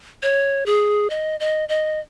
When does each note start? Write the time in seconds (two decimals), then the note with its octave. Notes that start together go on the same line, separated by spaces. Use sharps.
0.23 C#5
0.66 G#4
1.10 D#5
1.40 D#5
1.69 D#5